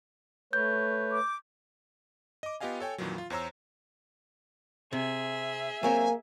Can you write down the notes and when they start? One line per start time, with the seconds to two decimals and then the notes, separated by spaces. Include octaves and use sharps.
0.53 A3 B4 C#5 G6
1.10 D6
2.43 D#5 D6
2.60 B3 F4 G4 D#5 F5 G#5
2.80 A4 C#5 G5 G#5
2.98 F2 A#2 D#3 E3 F#3
3.18 F4
3.30 E2 C5 C#5 A#5 E6
4.93 C3 G#4 E5
5.83 F#3 A#3 C4 C#5 G#5